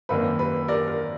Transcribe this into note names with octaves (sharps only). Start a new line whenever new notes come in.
G#1 F#2 D#3 A#3 D4 B4
B4
A#4 D5
A#4